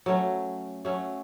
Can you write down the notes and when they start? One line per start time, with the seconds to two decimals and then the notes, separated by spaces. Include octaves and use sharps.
0.06 F#3 A3 C#4
0.85 F#3 A3 C#4